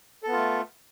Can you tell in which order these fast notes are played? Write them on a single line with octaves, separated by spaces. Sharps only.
A4 B3 F4 A3